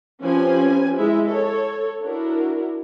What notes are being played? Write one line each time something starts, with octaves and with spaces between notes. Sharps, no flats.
F3 C4 C#4 G4 B4 G#5
G#3 E4 E5
A4 C#5
D4 E4 F#4 A#4